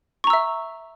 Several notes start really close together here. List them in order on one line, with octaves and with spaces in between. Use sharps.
C#6 A#5 E6 E5